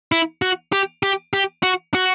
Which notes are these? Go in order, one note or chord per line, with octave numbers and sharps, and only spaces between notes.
E4
F#4
G4
G4
G4
F#4
F#4